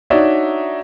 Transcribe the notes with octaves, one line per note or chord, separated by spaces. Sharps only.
D4 D#4 F#4 C#5 D5 E5